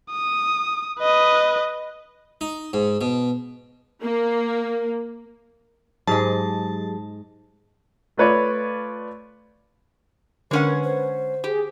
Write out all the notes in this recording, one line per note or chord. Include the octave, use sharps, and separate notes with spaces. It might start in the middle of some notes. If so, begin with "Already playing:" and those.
D#6
B4 D#5
D#4
G#2
B2
A#3
G#2 F#3 G#3 G4 G#4 A5
A3 F4 B4 C#5 D5
D3 G#3 C#4 D4 A#4 B4 F#5
C5
G4 G#4